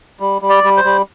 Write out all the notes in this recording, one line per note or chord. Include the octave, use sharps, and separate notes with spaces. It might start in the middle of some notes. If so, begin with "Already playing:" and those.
G3
G3
D5
G3
C5
G3